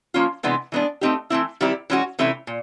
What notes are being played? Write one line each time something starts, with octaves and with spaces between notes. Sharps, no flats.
F3 A#3 C#4 F4
C3 E3 G#3 B3 D4
E3 G#3 B3 D4
A3 C4 D#4 G4
E3 A3 C4 E4
D#3 G3 C4 E4 G4
E3 G#3 C#4 F#4
C3 E3 A3 C#4 E4
A#2